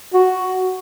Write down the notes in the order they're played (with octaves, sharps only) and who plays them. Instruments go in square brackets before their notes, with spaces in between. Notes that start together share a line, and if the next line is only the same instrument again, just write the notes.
[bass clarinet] F#4